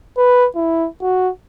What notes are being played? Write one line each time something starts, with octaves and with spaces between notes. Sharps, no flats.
B4
E4
F#4